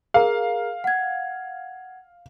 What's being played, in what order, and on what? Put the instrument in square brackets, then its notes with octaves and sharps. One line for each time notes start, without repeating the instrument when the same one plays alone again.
[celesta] G#4 A#4 A#5 [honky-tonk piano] F5
[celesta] F#5 G#6